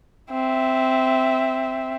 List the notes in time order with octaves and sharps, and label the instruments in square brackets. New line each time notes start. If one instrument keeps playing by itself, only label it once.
[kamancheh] C4 E5